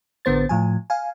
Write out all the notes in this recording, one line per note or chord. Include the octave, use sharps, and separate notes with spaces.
A1 D3 B3 C5 A6
A2 F3 G#5
F5 G#5